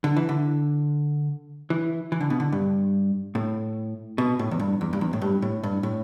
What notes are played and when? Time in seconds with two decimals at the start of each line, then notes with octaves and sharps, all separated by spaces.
0.04 D3
0.17 E3
0.29 D3
1.70 E3
2.12 E3
2.20 D3
2.30 B2
2.40 D3
2.52 G2
3.35 A2
4.18 B2
4.39 A2
4.51 E2
4.59 G2
4.81 E2
4.93 G2
5.01 E2
5.13 A2
5.22 G2
5.42 A2
5.63 G2
5.83 A2